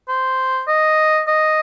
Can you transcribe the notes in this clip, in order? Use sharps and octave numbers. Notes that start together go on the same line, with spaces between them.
C5
D#5
D#5